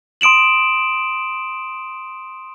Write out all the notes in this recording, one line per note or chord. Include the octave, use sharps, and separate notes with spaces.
C6 D#6 D7 E7 F#7